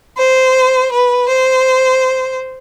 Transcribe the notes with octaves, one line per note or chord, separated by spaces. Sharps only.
C5
B4
C5